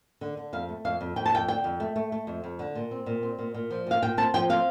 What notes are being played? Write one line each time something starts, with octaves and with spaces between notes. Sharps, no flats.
D3
D3
F2 F5
A3
F2 F5
F2
F2 G5
A5
F2 G5
D3 G5
F2
A3
A3
A3
F2
F2
D3
A#2
C4
A#2
C4
A#2
A#2
F3
A#2 F5
A#2 G5
C4 A5
F3 G5
C4 F5